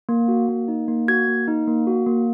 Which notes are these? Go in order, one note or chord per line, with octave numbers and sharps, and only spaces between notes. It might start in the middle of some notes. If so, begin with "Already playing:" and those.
A#3
F#4
A#3
D#4
A#3
F#4 G#6
A#3
D#4
A#3
F#4
A#3